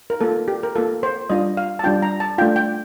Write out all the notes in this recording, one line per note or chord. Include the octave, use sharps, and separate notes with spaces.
A#4
A#3 F4 A4
G4
A#4
A#3 F4 A4
C5
G3 D4 F4 D#5
F5
A5
G3 D4 F4 G5
A#5
A5
A3 D4 F4 G5
G5